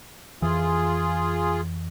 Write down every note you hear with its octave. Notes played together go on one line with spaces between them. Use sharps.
F2 E3 F4 G#4